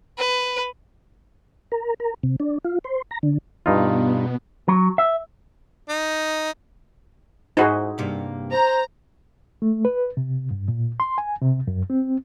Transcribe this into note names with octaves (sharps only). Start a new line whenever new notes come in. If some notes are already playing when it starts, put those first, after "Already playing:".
B4
A#4
A#4
C3
D4
F4
C5
A#5
D3
G2 B2 B3 D#4 F4
F#3
E5
D#4
G#2 D#4 E4 F#4 G#4 C5
G2 C3 A#3
C5 A#5
A3
B4
C3
G2
A#2
C6
G#5
C3
F#2
C4